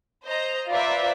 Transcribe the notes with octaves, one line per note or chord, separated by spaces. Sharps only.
C5 D#5 A#5
F4 B4 C5 D5 E5 A#5